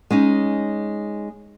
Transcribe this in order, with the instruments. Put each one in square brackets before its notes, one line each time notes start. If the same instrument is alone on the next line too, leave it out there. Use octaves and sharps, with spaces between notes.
[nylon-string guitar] G#3 C#4 D#4